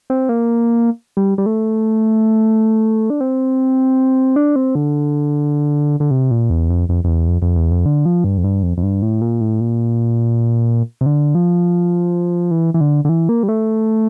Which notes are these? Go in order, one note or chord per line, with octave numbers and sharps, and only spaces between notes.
C4
A#3
G3
G3
A3
D4
C4
D4
C4
D3
D3
C3
A#2
E2
F2
F2
F2
E2
F2
F2
E2
F2
D3
F3
G2
F2
G2
F2
F2
G2
A2
A#2
A2
A#2
C3
D3
F3
E3
E3
D3
D3
E3
A#3
G3
A3